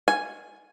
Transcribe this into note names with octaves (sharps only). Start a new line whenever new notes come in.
G#5